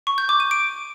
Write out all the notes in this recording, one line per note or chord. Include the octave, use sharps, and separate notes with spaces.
C#6
G6
D6
D#7
D7